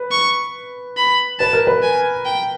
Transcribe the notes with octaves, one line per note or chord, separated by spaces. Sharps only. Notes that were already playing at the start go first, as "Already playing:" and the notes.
Already playing: B4
C#6
B5
B4 A5
A#4
B4
G#5
G5